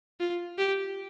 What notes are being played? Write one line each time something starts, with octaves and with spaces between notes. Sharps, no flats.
F4
G4